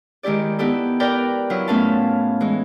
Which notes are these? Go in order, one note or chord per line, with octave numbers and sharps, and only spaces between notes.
D#3 G#3 E4 G4 D5
B3 D#4 E4 G4 A4
A#4 B4 D5 G5 A#5
F#3 E4 F4
A2 A3 B3 C#4 F5 A5
E3 G#3